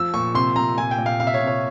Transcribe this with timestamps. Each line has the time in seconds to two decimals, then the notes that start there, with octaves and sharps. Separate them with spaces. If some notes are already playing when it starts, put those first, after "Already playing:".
Already playing: F3 E6
0.14 A#2 C#6
0.34 C3 C6
0.56 C3 A#5
0.78 A#2 G#5
0.91 G5
0.98 A#2
1.06 F5
1.20 C3 F5
1.27 E5
1.34 C#5
1.41 C3
1.47 C#5